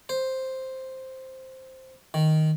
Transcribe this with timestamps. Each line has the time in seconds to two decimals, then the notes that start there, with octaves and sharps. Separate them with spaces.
0.09 C5
2.14 D#3